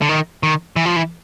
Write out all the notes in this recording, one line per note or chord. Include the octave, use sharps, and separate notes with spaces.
D3
D#3
D#3
E3
F3
E3